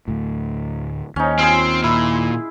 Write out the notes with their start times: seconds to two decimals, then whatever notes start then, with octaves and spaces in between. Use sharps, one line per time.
0.08 D2 A2
1.16 D#2 C#4 D#4
1.39 C4 F4 G#4 C6
1.84 A#2 E4